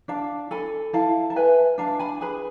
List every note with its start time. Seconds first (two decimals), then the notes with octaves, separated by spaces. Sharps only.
0.08 D4 F5 A5
0.51 A4 G#5 B5
0.93 E4 F5 A5
1.30 A5
1.36 B4 E5 G#5
1.78 D4 F5 A5
1.99 G#5 B5
2.21 G#4 B4 G#5 B5